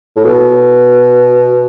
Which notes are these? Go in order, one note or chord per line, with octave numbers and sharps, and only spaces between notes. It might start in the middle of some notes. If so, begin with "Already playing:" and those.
A2
B2